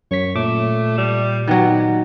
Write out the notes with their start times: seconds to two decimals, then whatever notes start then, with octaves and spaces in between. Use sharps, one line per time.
0.11 F#2 C#5 B6
0.35 A#2 A3 D6
0.98 G3
1.48 D#3 F#3 B3